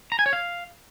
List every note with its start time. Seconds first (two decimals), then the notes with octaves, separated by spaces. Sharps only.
0.12 A#5
0.19 G#5
0.26 C#5
0.33 F5